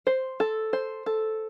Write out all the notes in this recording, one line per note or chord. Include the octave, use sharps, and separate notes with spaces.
C5
A4
C5
A4